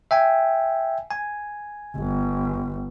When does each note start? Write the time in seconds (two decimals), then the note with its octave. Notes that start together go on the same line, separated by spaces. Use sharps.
0.11 E5 G5 G#5
1.11 G#5
1.96 G1